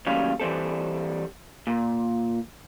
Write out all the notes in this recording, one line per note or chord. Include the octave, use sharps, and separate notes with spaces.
D#2 A2 F#3 G3 C#4 F5
E3 G3 C4 A4
A#2